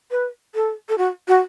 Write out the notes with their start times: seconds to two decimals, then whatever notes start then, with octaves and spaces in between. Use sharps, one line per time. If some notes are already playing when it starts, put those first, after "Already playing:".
0.11 B4
0.55 A4
0.89 A4
0.98 F#4
1.28 F#4